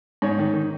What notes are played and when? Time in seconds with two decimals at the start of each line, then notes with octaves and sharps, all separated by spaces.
0.22 G#2 C#5
0.39 D#3
0.53 D#3